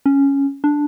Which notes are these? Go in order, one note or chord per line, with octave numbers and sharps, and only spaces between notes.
C#4
D4